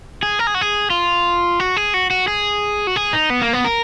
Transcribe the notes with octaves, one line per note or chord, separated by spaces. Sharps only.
G#4
A#4
G#4
F#4
G#4
F4
F#4
G#4
F#4
F#4
G#4
F#4
G#4
D#4
B3
A#3
B3
A#4